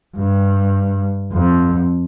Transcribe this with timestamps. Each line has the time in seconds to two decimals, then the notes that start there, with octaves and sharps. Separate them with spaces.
0.16 G2
1.32 F2